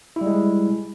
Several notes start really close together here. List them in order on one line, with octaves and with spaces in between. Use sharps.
E4 G3 G#3